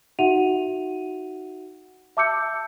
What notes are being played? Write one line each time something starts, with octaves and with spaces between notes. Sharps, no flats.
D#4 F#4 E5 F#5 D#7 F7
E5 A5 D6 E6 G6 C#7